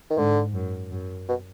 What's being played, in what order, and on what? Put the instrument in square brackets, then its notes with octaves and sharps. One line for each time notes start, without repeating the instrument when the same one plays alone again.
[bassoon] D#3
[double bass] G#2 [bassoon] D3
[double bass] F#2
F#2
[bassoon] B2